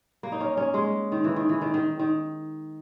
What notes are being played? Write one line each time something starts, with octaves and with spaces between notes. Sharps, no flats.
A#3
D#4
C#4
C#4
G#3
D#3
E3
D#3
E3
D#3
D#3
D#3